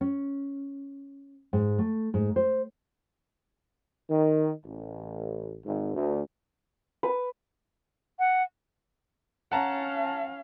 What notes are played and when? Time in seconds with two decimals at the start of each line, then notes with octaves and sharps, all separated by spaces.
0.01 C#4
1.53 G#2
1.78 A3
2.14 G#2
2.36 C5
4.10 D#3
4.65 A1
5.64 G#1
5.95 D2
7.03 B4
8.19 F#5
9.52 C#4 F5 F#5 A5 A#5